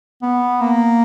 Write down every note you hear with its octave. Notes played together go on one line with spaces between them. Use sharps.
B3
A#3